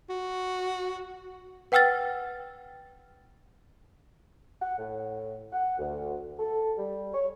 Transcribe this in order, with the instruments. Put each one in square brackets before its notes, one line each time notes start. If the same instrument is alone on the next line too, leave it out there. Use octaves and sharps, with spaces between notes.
[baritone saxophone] F#4
[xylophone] B4 F#5 G5 E6 F6 A6
[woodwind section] F#5
A2
F#5
D2
A4
G3
C#5